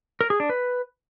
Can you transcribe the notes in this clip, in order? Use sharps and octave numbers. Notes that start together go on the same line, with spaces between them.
A#4
G#4
D4
B4